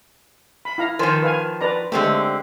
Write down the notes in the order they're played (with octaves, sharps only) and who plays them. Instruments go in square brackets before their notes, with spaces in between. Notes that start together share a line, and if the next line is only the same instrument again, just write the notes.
[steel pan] B5
E4 F5 A#5
[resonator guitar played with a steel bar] D#3 F3 [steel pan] A#4 C5 G#5
[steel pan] B4 F5 G#5
B4 D5 A#5
[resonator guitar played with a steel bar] D3 C4 G4 [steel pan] G#3 A3